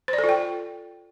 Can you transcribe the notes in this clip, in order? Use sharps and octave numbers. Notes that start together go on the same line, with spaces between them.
C5
D5
A4
F4
G5